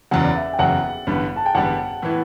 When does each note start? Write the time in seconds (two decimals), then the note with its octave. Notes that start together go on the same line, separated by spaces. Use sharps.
0.11 F#1 E2 C#3 F#3 F#5
0.24 D5
0.35 E5
0.53 G5
0.59 F#1 E2 C#3 F#3 F#5
1.07 A1 G2 D3 G3 B3
1.36 A5
1.46 G5
1.55 A1 G2 D3 G3 B3 F#5
2.02 A2 E3 B3 E4